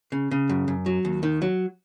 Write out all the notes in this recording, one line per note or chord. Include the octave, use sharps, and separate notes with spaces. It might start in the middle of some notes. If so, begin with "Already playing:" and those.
C#3
C#3
F#2
F#2
F#3
D#2
D#3
F#3